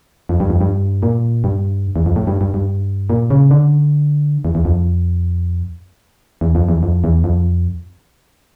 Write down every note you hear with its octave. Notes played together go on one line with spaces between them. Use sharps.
F2
G2
F2
G2
A#2
G2
E2
F2
A2
G2
G2
G2
A#2
C#3
D3
E2
E2
F2
E2
F2
E2
F2
E2
F2